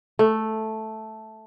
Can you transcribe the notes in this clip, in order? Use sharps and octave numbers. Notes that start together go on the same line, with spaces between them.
A3